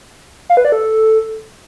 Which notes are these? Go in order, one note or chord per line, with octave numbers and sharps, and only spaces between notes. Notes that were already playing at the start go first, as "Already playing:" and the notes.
F5
B4
D5
A4